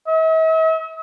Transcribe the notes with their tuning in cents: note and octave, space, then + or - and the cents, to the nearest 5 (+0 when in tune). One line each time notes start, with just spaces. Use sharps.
E5 -45